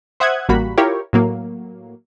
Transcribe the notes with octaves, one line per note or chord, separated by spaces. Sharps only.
C5 E5 F#5 D#6 F#6 G#6
A1 G3 A#3 F#4 B5
E4 F4 G4 A#4 C#5
A2 F#3 A#3